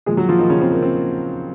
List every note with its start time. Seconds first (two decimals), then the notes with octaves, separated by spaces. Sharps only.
0.06 A#2 F3 G#3 G#4
0.17 F#3 F#4
0.29 F3 F4
0.39 D#3 D#4
0.50 C#3 C#4
0.61 C4
0.72 A#3
0.83 C4